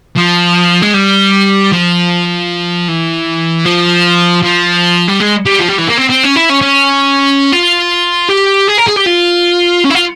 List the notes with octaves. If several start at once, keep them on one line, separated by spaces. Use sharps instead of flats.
F3
G#3
G3
F3
E3
F3
F3
G3
G#3
G3
F3
G3
E3
A#3
C4
C4
C#4
E4
C#4
C#4
F4
G4
G#4
A#4
G#4
G4
F4
C#4
E4
F4